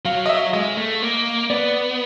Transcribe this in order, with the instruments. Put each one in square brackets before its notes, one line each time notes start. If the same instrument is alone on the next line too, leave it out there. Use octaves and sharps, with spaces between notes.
[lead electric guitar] F#3 [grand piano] F5
[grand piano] D#5
E5
[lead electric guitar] G#3 [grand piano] D#5
[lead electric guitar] A3
A#3
[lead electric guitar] B3 [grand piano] D5